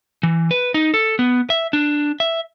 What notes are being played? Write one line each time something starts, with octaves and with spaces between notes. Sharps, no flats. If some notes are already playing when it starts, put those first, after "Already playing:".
E3
B4
D#4
A4
B3
E5
D4
E5